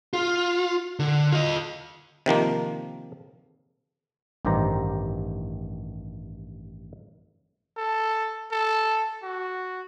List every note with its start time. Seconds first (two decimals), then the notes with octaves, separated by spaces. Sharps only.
0.13 F4
0.99 D3
1.32 F4 D#5
2.26 C3 D#3 F3 A#3
4.45 A1 G2 D#3 G4 C5 A#5
7.77 A4
8.52 A4
9.23 F#4